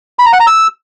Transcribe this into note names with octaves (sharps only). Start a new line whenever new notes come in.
B5
A#5
F#5
A#5
E6